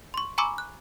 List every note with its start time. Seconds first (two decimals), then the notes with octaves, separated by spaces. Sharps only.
0.14 C6 C#6
0.38 G#5 A#5 B5 C#6 D6 E6
0.58 F#6